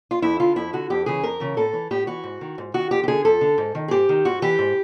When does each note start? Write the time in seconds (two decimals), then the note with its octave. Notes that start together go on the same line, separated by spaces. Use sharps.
0.11 F4
0.22 F2 E4
0.40 D3 F4
0.56 F2 E4
0.73 D3 F#4
0.90 F2 G4
1.06 C#3 E3 G#4
1.23 F2 A#4
1.40 C#3 E3
1.57 A2 A4
1.73 E3
1.91 A2 G4
2.07 E3 F#4
2.24 G#2
2.41 D#3
2.58 G#2
2.74 D#3 F#4
2.91 F2 G4
3.03 G4
3.08 D3 G#4
3.25 F2 A4
3.41 D3
3.58 G#2
3.75 D#3
3.88 G#4
3.91 G#2 G4
4.09 D#3
4.25 G#2 F#4
4.42 E3 G4
4.59 G#2